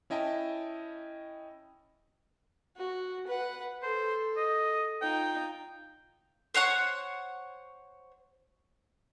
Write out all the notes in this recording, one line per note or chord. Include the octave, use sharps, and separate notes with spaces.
C#4 E4 D#5 G5 A5
F#4
B4 F#5
A4 C5
D#5
D#4 F4 G5
C5 C#5 F#5 C#6